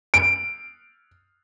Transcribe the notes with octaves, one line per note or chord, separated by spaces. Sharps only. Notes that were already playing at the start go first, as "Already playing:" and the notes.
D7